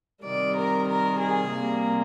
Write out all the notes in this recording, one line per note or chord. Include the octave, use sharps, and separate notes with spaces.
C3 D#3 G3 D5
A#4
A#4
G#4
C3 G3 A#3